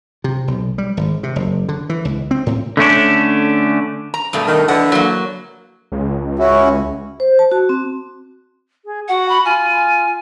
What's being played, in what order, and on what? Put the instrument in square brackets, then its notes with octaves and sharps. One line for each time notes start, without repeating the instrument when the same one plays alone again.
[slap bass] C3
B1
G3
G#1
C3
F#1
D3
E3
C#2
C4
A2
[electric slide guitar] D3 A3 C#4 D4
[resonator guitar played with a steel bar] A#5
G2 B2 A3
[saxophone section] D#3
[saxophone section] D3 E3 [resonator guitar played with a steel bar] F#5
[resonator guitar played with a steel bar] F#3 A#3
[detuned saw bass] C#2
[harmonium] C#4 E4 F#4
[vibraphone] C5
A5
F#4
C4
[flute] G#4
[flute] F#4 [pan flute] F#5
[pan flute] B5
[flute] F4 [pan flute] G#5